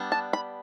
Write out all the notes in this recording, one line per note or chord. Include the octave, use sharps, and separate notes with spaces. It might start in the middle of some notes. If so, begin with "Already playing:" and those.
Already playing: G3 B3 D4
A5
B5